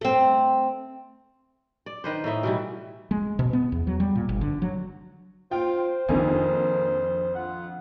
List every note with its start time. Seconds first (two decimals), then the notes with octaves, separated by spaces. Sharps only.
0.01 A3 C4
1.86 D5
2.04 D#3 B4 C5
2.24 A2 D#4 E4 E5
2.43 B2 E3 G3
3.11 G#3
3.39 B2
3.53 B3
3.72 E2
3.87 F#3
4.00 G3
4.15 A#2
4.29 G1
4.41 D3
4.62 F#3
5.51 F4 C5 G5
6.08 A#1 F2 D#3 A#3 G#5
7.35 F4 F#5